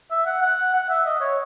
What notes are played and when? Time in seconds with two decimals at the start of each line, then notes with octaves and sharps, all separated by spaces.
0.11 E5
0.26 F#5
0.42 F#5
0.74 F#5
0.89 E5
1.05 D#5
1.21 C#5